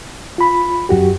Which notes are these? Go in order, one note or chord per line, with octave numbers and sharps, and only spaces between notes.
F4 B5
F#2 F#4 G4